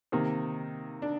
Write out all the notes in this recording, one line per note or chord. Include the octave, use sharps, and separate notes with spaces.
C3 D#3 A#3
D4